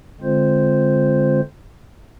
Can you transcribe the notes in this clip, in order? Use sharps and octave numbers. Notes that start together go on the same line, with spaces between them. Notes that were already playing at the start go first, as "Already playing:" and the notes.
D3 G#3 C4 F4 C5